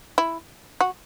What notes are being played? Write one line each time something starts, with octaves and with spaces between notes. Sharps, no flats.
E4
F#4